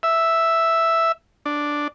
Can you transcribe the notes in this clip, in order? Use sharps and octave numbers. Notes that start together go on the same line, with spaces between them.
E5
D4